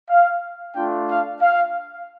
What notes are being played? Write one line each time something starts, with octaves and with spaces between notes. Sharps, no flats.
F5
A3 D4 F4 G5
F5
F5